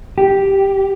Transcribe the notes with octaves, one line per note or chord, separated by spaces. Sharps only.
G4